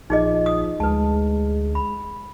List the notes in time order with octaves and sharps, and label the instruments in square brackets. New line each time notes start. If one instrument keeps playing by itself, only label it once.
[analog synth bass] A#1 [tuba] F3 [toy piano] D#4 G#4 D#5
[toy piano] D#6
[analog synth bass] D2 [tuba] G#3 [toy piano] B4 A5
[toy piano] B5